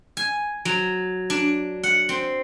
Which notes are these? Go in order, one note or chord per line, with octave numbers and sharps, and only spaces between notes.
G#5
F#3
D4
F#5
C4